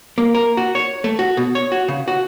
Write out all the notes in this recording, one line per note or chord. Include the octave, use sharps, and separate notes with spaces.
A#3
A#4
F#4
C#5
A3
F#4
B2
C#5
F#4
C#3
F#4